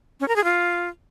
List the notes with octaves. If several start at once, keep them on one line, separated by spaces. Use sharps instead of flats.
C#4
A#4
G#4
F4